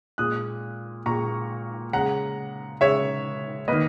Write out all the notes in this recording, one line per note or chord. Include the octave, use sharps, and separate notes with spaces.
A#2 G#3 D#6 F#6
A#2 G#3 A#5 C#6
C#3 G#3 F#5 A#5
C#3 G#3 C#5 E5
D#3 A#3 B4 D#5